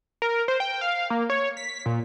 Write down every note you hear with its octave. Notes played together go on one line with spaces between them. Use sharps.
A#4
C5
G5
F5
A#3
C#5
B6
A#2